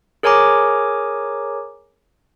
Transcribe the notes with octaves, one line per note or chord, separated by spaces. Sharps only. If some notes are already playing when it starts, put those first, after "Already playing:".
G#4 A#4 C#5 G#5 A#5 D6